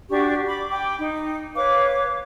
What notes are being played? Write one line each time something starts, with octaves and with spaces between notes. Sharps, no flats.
D4 F#4 G4 C#6
B5 D6
G5 B5 D6
D#4
B4 C#5 F5 D6